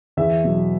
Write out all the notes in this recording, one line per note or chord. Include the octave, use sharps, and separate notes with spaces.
E2 E5
B2 F#3